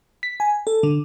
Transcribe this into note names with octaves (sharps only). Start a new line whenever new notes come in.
B6
G#5
A4
D3